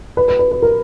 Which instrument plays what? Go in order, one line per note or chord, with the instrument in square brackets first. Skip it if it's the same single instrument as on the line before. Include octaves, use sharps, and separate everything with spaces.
[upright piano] B4
B4
B4
B4
A#4